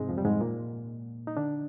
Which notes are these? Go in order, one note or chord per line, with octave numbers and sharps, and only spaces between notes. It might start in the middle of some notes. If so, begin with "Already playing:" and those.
Already playing: G#2 C3 G#3 C4
F2 F3
G3
G#2 G#3
A#2 A#3
D#4
D3 D4